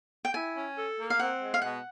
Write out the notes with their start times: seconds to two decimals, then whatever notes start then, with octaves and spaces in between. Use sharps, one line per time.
0.25 G5
0.34 E4 G#5
0.55 C#4
0.77 A4
0.98 A#3
1.10 F5
1.19 C4 F#5
1.40 G#3
1.54 F5
1.62 B2 F#5